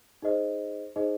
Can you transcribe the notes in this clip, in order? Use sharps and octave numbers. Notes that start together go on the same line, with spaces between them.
D#4 G#4 C5 D#5
D#4 G#4 C5 D#5